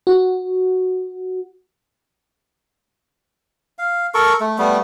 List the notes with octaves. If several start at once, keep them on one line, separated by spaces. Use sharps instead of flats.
F#4
F5
A4 A#4 C#6
A3
G3 A3 B3